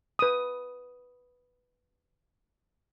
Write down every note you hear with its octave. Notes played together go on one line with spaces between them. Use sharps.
B4 D#6